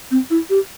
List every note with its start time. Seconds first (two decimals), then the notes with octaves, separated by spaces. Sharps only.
0.11 C4
0.30 E4
0.50 G4